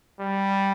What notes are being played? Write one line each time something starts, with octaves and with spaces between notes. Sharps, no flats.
G3